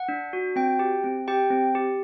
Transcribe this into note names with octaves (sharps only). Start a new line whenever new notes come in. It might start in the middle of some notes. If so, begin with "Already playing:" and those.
Already playing: F#5
D4
F#4
C4 G5
G4
C4
G4 G5
C4
G4